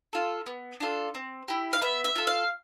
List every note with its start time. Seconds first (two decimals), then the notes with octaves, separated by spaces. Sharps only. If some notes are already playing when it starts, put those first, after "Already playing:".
0.13 F4 A4
0.46 B3
0.80 D4 F4 A4
1.15 C4
1.48 E4 G4
1.73 F5
1.81 B3 E5
2.04 E5
2.16 F4 A4
2.27 F5